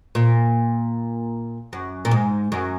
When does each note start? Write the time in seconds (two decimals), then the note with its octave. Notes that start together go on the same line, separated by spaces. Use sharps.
0.15 A#2
1.73 F#2
2.05 A#2
2.11 G#2
2.52 F#2